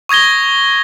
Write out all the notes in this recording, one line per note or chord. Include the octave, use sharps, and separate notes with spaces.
C#6 D#6 G#6 A#6 G7